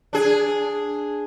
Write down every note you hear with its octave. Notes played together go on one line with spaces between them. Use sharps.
D4 G#4